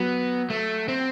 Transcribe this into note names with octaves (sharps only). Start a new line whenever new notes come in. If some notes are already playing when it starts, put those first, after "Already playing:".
Already playing: F#3 B3
A3
C4